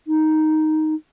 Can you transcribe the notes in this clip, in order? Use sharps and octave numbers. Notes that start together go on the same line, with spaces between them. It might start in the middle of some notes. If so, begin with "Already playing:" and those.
D#4